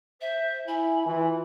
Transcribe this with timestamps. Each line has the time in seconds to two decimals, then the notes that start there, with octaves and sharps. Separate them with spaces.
0.21 C5 E5
0.67 E4 G#5 B5
1.06 E3 F4